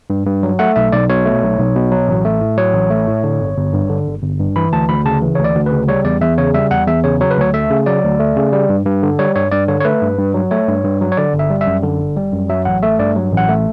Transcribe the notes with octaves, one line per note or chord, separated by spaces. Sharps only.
G2
G2
F#3
A3 F#5
B1 E5
B1 D5
B2 C#5
A3
B1
B1
B2
F#3
A1
A3
A2
F#3 C#5
A1
A3
A2
D3
G1
G1
G2
D3
G1
G1
G2
E3 B5
D2 A5
D2 B5
C#3 A5
E3
D2 C#5
D5
D2
B4
C#3
G3 C#5
E2 D5
E2 E5
C#3 C#5
G3 E5
E2 F#5
E2 E5
C#3 C#5
F#3 C#5
B4
D2 C#5
A3 E5
C#3
F#3 D5
D2
A3
C#3
G3
G2
G2
D3
G3 C#5
G2 C#5
G2 D5
D3 C#5
C#5
A3 B4
G2
G2
F#3
A3 C#5
G2
G2
F#3
C#5
D3 D5
G1
E5
G3
E5
F#2
D3
G1
G3
F#2
F#3 E5
A1 F#5
A3 E5
G2 D5
F#3
A1
F#5
A3